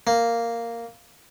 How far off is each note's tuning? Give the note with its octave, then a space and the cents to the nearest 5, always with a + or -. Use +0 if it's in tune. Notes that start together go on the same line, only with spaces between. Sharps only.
A#3 -5